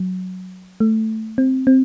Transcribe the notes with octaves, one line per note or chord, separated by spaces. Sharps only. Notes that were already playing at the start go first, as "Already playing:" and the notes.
Already playing: F#3
A3
C4
C4